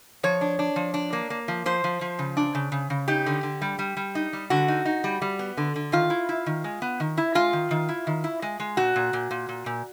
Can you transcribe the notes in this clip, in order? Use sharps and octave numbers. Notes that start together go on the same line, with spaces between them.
F3 C#5
D4
D4
F3
D4
A#3
A#3
F3
F3 C5
F3
F3
C#3
D4
C#3
C#3
C#3
D#4 G4
D3
D3
G3
G3
G3
D#4
G3
D3 F#4
D#4
D#4
G3
G3
B3
D3
D3
D#3 F4
E4
E4
D#3
G#3
B3
D#3
E4
G#3 F4
D#3
D#3
E4
D#3
E4
G#3
G#3
A#2 F#4
A#2
A#2
A#2
A#2
A#2